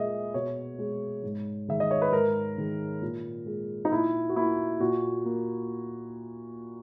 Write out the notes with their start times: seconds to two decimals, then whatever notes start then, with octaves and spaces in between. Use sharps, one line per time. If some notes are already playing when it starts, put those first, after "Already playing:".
Already playing: A#2 G#3 G#4 D#5 E5
0.34 B2 C#5
0.78 G#3
1.23 G#2
1.68 D#3 G#3 E5
1.80 D#5
1.91 C#5
2.02 B4
2.12 G#2 A#4
2.58 D#3 G#3
3.02 A#2
3.46 G#3
3.85 D#4
3.91 A#2 E4
4.29 F#4
4.36 A#3 E4
4.80 A#2 F#4
5.25 A#3